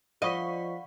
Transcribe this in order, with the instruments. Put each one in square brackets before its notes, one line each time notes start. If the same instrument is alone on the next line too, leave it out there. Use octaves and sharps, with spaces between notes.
[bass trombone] F3 [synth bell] D5 C#6 B6 [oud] D#5 [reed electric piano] F5 F#5 B5